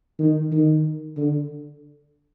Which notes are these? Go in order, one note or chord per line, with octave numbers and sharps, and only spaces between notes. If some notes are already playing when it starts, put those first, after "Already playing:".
D#3
D#3
D3